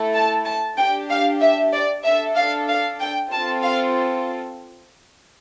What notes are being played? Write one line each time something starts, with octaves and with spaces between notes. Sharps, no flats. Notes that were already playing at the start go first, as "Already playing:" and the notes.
Already playing: A3 E4 A4
A5
A5
D4 G4 G5
F5
E5
D5
D4 A4 E5
F5
F5
G5
C4 F4 A4 A5
F5